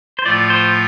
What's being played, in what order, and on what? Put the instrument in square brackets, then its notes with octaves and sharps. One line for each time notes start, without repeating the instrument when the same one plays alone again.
[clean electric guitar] C5
[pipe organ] A2 F3 A3 F4 [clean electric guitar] D5
[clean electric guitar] C5